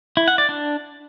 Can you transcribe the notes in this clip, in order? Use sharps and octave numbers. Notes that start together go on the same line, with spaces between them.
E4
F#5
D5
D4